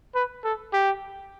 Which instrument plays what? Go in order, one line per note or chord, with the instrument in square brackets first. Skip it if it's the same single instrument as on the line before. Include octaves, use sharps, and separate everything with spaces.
[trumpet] B4
A4
G4